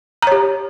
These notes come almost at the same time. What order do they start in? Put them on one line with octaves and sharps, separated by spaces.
A#5 C#5 G4